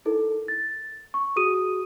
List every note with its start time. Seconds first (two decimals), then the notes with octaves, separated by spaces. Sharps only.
0.05 D#4 E4 A4 A#4
0.48 A6
1.14 C#6
1.36 F#4 G#4 D#6 D#7